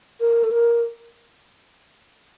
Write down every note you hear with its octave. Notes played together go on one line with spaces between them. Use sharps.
A#4
A4
A#4